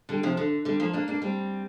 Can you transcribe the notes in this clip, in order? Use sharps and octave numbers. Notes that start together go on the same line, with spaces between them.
D3 G3
C3 F3
D3
D3 G3
F3 A#3
A#3 D4
A#3 D4
G3 C4